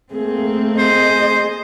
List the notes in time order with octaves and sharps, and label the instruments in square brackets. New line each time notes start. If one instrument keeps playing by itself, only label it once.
[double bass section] A3 A#3 [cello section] C4 [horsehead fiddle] G#4
[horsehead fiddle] G#4 D#5 [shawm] C5